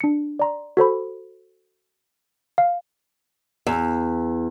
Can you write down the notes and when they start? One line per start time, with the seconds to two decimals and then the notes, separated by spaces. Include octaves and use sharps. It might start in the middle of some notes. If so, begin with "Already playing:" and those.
0.01 D4 C#7
0.39 D5 A#5 C6
0.77 F#4 A4 C5 B5
2.58 F5
3.67 E2